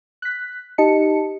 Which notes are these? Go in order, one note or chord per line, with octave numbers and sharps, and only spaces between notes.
F#6 B6
D#4 G4 D#5 A5 C#7